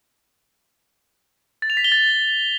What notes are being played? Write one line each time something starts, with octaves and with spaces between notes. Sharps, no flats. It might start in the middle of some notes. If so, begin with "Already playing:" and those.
A6
F7
B6
G7
A6